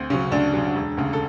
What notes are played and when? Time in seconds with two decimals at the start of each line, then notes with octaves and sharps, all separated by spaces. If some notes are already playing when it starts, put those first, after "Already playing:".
Already playing: D2 C4
0.10 C#3 F#3 C#4
0.32 D2 D4
0.54 C#3 F#3
0.76 E1
0.97 D2 C#3
1.13 A4